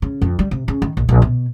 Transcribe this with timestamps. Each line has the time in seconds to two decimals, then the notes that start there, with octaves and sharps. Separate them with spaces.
0.02 C#3
0.21 F2
0.39 G3
0.51 C3
0.68 C#3
0.82 D#3
0.97 A#1
1.09 A#1
1.22 B2